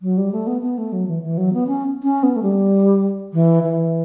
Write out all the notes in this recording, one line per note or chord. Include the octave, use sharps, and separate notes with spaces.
F#3
G3
A3
B3
B3
A3
F#3
E3
E3
F#3
B3
C#4
C#4
B3
A3
G3
E3
E3